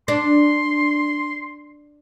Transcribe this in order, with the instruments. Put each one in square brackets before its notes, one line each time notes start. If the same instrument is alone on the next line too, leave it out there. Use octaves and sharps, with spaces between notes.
[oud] D4 [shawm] C6